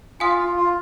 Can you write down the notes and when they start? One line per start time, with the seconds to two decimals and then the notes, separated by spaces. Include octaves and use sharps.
0.20 F4 F5 G#5 D#6
0.38 F4
0.56 F4